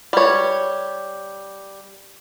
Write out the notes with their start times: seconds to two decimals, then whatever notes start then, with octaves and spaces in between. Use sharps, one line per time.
0.13 G3 C#5